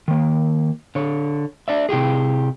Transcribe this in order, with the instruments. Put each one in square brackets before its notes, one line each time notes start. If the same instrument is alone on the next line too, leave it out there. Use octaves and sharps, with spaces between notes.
[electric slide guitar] D#3 A#3
D3 C#5
D4 D5 E5
C3 E4 G4 G#4